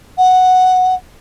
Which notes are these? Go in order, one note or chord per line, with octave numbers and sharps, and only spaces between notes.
F#5